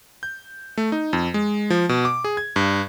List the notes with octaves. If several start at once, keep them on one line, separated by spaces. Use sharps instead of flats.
G6
A3
D#4
F2
G#3
F3
B2
D6
G#4
G#6
G2